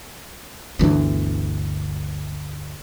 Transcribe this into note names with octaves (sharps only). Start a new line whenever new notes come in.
G1 D2 E3 D4